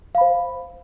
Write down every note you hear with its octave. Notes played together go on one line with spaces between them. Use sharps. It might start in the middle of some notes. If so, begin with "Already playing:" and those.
C5 F5 B5